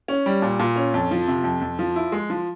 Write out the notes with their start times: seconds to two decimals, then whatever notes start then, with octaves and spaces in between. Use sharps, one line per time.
0.08 C#4
0.26 G3
0.42 A#2
0.59 A#2
0.76 C#4
0.94 F2
1.11 F3
1.28 C3
1.44 F2
1.61 F2
1.79 F3
1.96 E4
2.12 G#3
2.30 F3